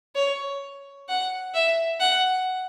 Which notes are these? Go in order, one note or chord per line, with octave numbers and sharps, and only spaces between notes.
C#5
F#5
E5
F#5